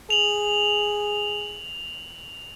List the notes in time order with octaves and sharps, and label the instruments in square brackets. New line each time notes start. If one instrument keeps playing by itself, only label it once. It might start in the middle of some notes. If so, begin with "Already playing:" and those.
[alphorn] G#4 [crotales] F7 F#7